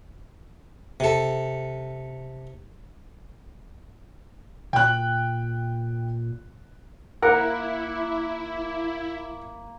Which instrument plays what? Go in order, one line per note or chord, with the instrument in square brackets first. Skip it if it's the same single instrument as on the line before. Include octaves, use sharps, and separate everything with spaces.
[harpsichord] C3 A4
[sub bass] A#2 [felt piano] G5 F#6
[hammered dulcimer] A#3 [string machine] E4 [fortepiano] A#4 F#5